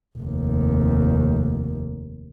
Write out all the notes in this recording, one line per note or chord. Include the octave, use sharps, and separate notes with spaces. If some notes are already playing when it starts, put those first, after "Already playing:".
F1 D#2